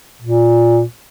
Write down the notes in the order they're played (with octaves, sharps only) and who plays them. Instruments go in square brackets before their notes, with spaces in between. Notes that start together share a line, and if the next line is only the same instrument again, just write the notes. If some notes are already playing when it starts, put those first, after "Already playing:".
[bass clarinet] A#2